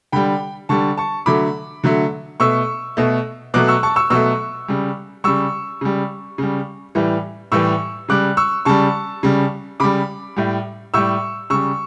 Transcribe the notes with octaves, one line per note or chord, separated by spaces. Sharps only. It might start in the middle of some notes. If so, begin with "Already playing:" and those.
D3 G3 G5 B5
D3 G3 A5 C#6
A5 C#6
D3 F#3 A3 B5 D6
D3 F#3 A3
B2 A3 C#6 E6
B2 A3
B2 F#3 A3 D6 F#6
C#6 E6
A5 C#6
C#6 E6
B2 F#3 A3 C#6 E6
C#3 G3
C#3 G3 C#6 E6
C#3 G3
C#3 G3
A2 E3 G3
A2 E3 G3 C#6 E6
C#3 G3 D6 F#6
C#6 E6
C#3 G3 A5 C#6
C#3 G3
C#3 G3 B5 D6
A2 G3
A2 G3 C#6 E6
C#3 G3 C#6 E6